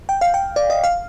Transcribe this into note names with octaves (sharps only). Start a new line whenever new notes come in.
G5
F5
G5
D5
D#5
F5